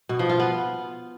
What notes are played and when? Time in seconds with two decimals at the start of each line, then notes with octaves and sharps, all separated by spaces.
0.09 B2
0.19 F3
0.29 F4
0.39 B3